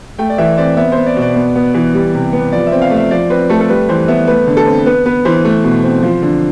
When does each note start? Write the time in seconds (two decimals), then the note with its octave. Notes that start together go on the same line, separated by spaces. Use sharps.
0.19 A3 G5
0.30 D5
0.38 E3 E5
0.58 C4 D5
0.77 B3 E5
0.92 B3 C5
1.06 D5
1.16 B2
1.21 D5
1.36 B3
1.56 B3
1.74 E3
1.94 G3
2.14 C3
2.33 B3
2.52 F3 D5
2.67 E5
2.72 C4
2.82 F5
2.91 A3
2.96 E5
3.11 F3 D5
3.30 C4 B4
3.50 A3 A4
3.61 A4
3.69 G3 B4
3.89 E3 C5
4.08 B3 E5
4.28 A3 B4
4.47 D3
4.57 A4
4.67 C4
4.86 B3 B4
5.06 B3 B4
5.25 E3 C5
5.45 A3
5.64 B2
5.83 C4
6.02 F3
6.22 D3